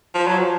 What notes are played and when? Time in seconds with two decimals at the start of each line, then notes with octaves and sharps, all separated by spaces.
0.14 F3
0.27 F#3
0.39 F3